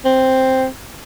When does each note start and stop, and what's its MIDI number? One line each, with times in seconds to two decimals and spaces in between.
0.05 0.66 60